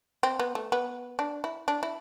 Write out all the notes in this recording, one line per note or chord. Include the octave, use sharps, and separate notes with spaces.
C4
B3
A3
B3
D4
E4
D4
E4